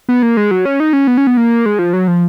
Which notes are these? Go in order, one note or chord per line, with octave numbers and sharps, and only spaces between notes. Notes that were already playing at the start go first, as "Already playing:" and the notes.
B3
A#3
G#3
F#3
C#4
D#4
C#4
B3
C#4
B3
A#3
G#3
F3
F#3
F3